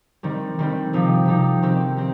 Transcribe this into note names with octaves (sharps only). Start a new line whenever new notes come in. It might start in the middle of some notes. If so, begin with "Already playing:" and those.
D#3 G3 C4
D#3 G3 C4
C3 F3 D#4 G4
C3 F3 D#4 G4
D#3 C4 G4
C4 G4